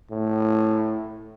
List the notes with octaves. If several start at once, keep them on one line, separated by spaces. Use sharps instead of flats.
A2